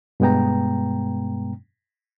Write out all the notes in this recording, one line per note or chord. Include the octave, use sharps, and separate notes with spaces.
G2 B2 G#3 B3 G5 A#5